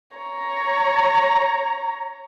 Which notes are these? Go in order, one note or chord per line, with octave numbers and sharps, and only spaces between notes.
C#5 A#5